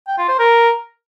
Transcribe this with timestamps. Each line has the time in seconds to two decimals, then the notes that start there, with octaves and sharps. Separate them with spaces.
0.07 G5
0.18 F4
0.29 C5
0.39 A#4